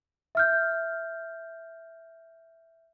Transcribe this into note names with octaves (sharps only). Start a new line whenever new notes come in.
E5 F6 G6